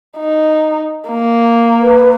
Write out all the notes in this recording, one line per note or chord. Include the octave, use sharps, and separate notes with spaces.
D#4
A#3
B4